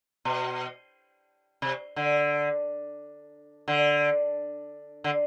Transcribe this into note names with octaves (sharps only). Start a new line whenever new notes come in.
B2
C3
D3
D3
D3